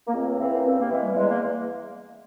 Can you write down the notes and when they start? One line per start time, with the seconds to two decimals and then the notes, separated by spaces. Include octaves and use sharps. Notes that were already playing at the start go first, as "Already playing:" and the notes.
0.07 A#3
0.14 C#2 C4
0.40 C#3 E3 C4
0.54 A#3
0.65 G2 C4
0.79 A#3
0.90 E3 G#3
1.03 G3
1.15 E2 G#3
1.27 A#3